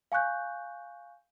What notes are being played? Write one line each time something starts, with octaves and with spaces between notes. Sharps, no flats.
F5 G#5 C#6 F#6 G6